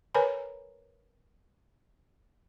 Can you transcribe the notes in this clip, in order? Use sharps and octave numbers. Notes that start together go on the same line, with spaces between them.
A#4 B4 C#5 G#5 A#5 B5